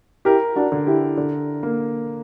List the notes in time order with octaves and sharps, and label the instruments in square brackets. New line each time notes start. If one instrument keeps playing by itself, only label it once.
[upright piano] E4 G4 [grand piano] A#4
[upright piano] D4 F#4
[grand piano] D3
[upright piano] E4 G4
[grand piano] D3
A#3